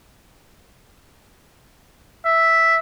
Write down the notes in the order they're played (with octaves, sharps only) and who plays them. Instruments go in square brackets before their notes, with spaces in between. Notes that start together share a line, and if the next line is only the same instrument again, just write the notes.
[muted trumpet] E5